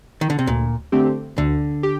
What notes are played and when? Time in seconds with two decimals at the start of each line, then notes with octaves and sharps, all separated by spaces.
0.21 D#3
0.30 D3
0.39 C3
0.47 D2 A#2
0.92 D3 A3 C4 G4
1.38 D2 D3
1.83 G4